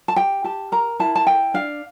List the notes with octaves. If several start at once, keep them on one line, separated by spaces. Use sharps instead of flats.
A5
G4 G5
G4 A5
A#4 A#5
E4 A5
A5
A4 G5
D4 F5